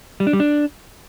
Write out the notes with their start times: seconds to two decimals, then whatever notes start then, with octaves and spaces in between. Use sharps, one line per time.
0.20 G3
0.27 D4
0.33 G3
0.40 D4